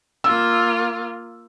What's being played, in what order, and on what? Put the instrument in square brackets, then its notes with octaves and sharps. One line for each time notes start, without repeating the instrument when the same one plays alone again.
[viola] A#3 F4 [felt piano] E6